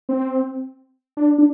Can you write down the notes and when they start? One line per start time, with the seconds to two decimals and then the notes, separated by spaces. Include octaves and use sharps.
0.09 C4
1.17 D4
1.38 D4